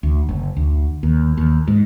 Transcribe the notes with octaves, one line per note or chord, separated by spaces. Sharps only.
D2
F#1
D2
D#2
D#2
G#2